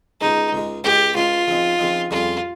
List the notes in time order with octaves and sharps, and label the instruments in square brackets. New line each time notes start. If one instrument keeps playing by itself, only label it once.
[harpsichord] C#2 C#3 G#3 [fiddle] D#4
[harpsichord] C#2 C#3 G#3
[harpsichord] C#2 C#3 G#3 C#4 [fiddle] G4
[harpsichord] C#2 C#3 G#3 C#4 [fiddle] F4
[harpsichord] C#3 F3 C4 D#4
C#3 F3 C4 D#4
[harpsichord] F2 C#3 G3 C#4 [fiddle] F4